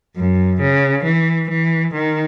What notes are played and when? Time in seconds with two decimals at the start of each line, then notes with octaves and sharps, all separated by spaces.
0.16 F#2
0.61 C#3
1.04 E3
1.50 E3
1.93 D#3